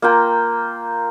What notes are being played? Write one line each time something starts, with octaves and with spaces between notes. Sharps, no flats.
A#3 F4 G5 A#5